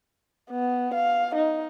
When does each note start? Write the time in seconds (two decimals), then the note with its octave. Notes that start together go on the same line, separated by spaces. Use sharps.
0.51 B3
0.94 F5
1.35 D#4